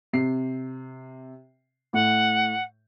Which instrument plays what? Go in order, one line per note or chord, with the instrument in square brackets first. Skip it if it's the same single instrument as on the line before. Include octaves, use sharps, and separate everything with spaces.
[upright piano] C3 C7
[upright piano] A2 [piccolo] F#5